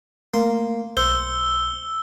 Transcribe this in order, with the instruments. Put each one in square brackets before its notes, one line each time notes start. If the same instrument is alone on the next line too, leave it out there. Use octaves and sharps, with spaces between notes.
[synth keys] A3 [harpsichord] A#3 C6
[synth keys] B1 [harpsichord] C5 [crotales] E6 G7